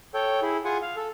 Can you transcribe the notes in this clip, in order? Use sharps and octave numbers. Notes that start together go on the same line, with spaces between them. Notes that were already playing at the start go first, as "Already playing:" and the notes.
A4 C#5 G5
E4 G#4
F4 G#4 F#5 G#5
F5
A4